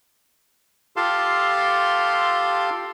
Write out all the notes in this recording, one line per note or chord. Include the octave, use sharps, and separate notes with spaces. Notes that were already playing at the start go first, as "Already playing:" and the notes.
F4 G4 A4 F5 A5 C6